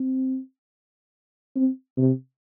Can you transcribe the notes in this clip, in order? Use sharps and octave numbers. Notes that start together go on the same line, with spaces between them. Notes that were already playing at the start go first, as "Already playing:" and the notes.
Already playing: C4
C4
C3